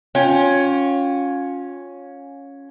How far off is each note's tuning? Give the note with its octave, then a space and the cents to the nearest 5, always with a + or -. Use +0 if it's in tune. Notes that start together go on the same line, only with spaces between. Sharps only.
C#4 +0 F4 +30 G5 +20